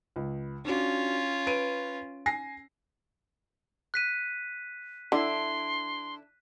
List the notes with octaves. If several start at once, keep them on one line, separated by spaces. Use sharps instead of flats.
C#2
C#4 D4 F4 F#4
B4 D7 D#7
G#5 A#6 C7
F#6 B6 D#7
D3 D4 E4 C6